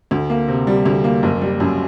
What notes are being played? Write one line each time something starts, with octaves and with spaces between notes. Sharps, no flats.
D2
A#3
C3
G3
D2
A#3
F#1
G3
F#2